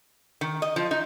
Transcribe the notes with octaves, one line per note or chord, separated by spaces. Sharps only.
D#3
D#5
F3
D#4